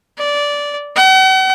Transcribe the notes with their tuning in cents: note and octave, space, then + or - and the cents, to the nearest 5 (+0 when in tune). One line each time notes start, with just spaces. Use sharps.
D5 -15
F#5 +45